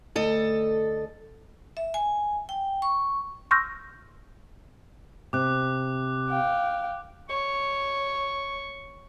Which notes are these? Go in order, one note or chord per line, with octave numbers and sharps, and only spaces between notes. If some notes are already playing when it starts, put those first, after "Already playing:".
D2 A4 D#5
E5
G#5
G5
C#6
C6 C#6 E6 F6 G6 A#6
C3 D6 F#6
F5 G5
C#5 C#6